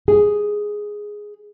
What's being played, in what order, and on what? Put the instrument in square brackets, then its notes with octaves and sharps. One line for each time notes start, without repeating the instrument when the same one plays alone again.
[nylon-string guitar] G#4